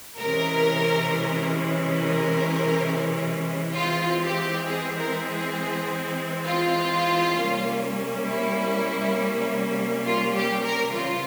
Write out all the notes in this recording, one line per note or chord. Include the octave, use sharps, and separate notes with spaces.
C3 E3 G#3 C#4 A#4
A#4
E3 G#3 C4 F4
G4
G#4
A#4
G#4
F4
C3 G3 A#3 C#4
E4
F4
G4
A#4
C#3 E3 G3 C4 F4